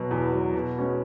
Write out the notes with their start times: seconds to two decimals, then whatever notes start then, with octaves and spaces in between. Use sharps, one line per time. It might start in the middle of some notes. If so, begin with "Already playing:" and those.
Already playing: B2 F#3
0.11 E2
0.33 B2 F#3
0.54 B2
0.76 G#3 C#4 F#4 B4